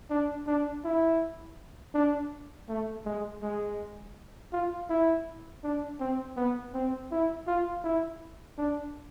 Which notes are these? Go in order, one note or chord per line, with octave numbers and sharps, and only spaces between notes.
D4
D4
E4
D4
A3
G#3
G#3
F4
E4
D4
C4
B3
C4
E4
F4
E4
D4